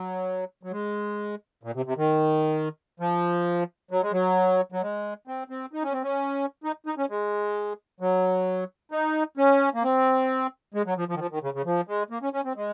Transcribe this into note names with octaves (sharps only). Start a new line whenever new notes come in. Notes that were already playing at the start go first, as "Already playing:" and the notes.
Already playing: F#3
F#3
G#3
A#2
C3
C3
D#3
F3
F#3
G#3
F#3
F#3
G#3
C4
C4
D#4
C#4
C4
C#4
D#4
D#4
C#4
G#3
F#3
D#4
C#4
A#3
C4
G#3
F#3
F3
F3
D#3
F3
D#3
C#3
C#3
F3
G#3
A#3
C#4
C#4
C4
G#3